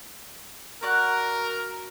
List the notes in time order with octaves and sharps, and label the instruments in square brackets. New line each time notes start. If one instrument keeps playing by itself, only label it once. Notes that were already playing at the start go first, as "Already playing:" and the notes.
[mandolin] F#4 D5 F#6 [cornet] A#4